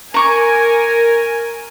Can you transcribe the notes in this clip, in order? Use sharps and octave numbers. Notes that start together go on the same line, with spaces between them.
A#4 G#5 A#5 C#6 D6